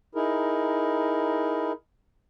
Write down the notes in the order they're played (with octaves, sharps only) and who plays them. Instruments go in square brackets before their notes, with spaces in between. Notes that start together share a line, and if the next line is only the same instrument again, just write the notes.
[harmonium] D#4 E4 G#4 A#4